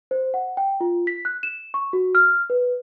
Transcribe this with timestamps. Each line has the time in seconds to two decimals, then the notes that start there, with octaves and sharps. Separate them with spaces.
0.11 C5
0.34 F#5
0.57 G5
0.81 F4
1.07 B6
1.25 F#6
1.43 E7
1.74 C#6
1.93 F#4
2.15 F6
2.50 B4